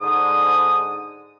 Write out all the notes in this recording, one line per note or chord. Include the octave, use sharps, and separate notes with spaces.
G#2 D3 D#6